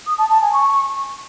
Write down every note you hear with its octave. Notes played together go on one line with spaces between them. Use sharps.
D#6
A5
A5
G#5
C#6